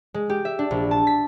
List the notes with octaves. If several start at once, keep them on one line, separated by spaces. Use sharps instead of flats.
G#3
G4
E5
D4
A#1
A5
B6